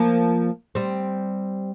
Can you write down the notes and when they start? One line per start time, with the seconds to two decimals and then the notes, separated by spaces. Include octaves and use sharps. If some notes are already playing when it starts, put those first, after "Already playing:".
Already playing: F3 A#3
0.75 G3 C4